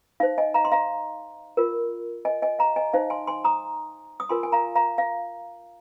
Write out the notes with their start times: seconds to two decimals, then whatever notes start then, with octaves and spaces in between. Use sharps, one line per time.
0.20 D#4 C5 F5
0.38 D#5 G#5
0.54 F5 A#5
0.65 C6
0.72 F5 A#5
1.57 F4 A#4
2.25 D#5 G#5
2.42 D#5 G#5
2.59 F5 A#5
2.76 D#5 G#5
2.93 D#4 C5 F5
3.10 G#5 C6
3.27 G#5 C6
3.44 A#5 D#6
4.20 D#6
4.29 F4 A#4 G#5 C6
4.43 G#5
4.52 F5 A#5
4.75 F5 A#5
4.98 F5